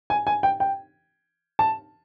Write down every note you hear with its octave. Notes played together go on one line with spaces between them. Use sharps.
G#5
G#5
G5
G5
A5